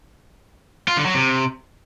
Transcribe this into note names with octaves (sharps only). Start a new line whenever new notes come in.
F4
D3
F#3
C3